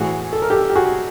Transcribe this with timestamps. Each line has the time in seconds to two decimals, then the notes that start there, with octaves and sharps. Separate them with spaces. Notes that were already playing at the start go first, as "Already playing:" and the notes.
Already playing: A2 E3 F#4 G#4
0.33 A4
0.42 A#4
0.50 G4 A4
0.70 G4
0.75 F#4 G#4